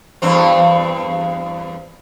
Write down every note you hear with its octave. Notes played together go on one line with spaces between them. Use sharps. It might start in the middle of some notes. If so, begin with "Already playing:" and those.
E2 G2 C4